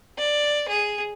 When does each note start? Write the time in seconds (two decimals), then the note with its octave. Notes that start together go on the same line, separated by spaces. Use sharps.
0.18 D5
0.69 G#4